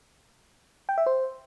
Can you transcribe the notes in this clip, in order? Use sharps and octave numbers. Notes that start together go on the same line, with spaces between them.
G5
E5
C5